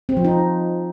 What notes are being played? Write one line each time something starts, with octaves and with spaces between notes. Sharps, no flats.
C4
F3
D#4